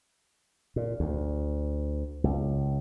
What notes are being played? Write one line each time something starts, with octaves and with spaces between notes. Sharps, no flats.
A#2
D2
C#2